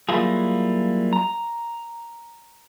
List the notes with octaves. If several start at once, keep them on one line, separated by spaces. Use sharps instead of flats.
F#3 G3 A#3 E4 F4 G#4
A#5